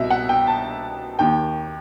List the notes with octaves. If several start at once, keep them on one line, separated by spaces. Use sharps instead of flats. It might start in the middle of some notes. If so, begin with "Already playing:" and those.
Already playing: C2 B2 D#5 E5
F#5
G5
A5
D#2 D#3 G5